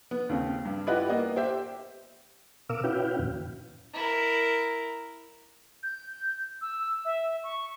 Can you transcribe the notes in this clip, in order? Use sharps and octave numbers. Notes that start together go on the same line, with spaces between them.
B3
D#2 C#3 C4
G2
E4 F4 G4 B4 D#5 F#5
A#3 B3 D#5
G4 C5 E5 G5
B2 A#4 F5 D6 E6
C#4 E4 F#4 B4 F5 G5
F2 A#2 D#3
E4 A#4
G6
E6
E5
C#6